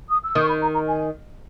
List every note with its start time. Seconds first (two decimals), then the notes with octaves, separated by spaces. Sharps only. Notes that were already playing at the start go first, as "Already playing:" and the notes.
0.10 D#6
0.24 E6
0.35 D#3 D#6
0.43 C#6
0.48 B5
0.62 A#5
0.74 A#5
0.88 G#5